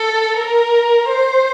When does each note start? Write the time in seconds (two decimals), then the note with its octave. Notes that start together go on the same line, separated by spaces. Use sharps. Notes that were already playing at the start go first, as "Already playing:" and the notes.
Already playing: A4
0.38 A#4
1.09 C5